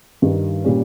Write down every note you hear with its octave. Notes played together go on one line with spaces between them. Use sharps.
G2 D#3 G3
A#2 G3 C#4